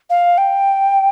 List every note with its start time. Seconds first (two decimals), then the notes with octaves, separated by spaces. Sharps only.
0.10 F5
0.38 G5